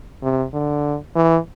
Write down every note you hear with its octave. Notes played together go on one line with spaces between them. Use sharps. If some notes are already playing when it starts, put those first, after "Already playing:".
C3
D3
E3